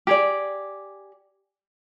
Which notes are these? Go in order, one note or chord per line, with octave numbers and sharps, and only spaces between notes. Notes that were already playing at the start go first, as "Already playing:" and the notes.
G4 G#4 D5